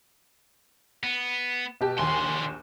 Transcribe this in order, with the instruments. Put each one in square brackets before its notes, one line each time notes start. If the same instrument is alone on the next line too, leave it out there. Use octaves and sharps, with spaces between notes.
[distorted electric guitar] B3
[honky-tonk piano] B2 G4 A5
[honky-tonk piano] A#1 D#2 G#5 [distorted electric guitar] D3 C6